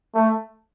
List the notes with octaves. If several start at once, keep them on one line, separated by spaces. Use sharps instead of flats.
A3